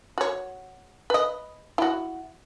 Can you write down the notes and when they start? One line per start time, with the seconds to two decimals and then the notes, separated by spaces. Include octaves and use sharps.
0.18 F#4 C#5
1.10 B4 D#5
1.78 E4 F#4